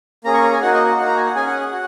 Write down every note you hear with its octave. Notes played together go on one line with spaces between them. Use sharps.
A#3 C#4 G#4 A#5
C#6
A#5
G#5
A#3 D#4 F#4 F#5
D#5
F#5
A#3 D#4 F#4 F#5
A#5
G#5
F#5
C#4 G#4 G#5
F#5
F#5
F#4